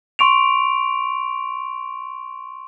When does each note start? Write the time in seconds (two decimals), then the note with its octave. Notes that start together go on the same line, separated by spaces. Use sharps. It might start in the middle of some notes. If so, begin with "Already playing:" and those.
0.19 C6 C#6 D7 F7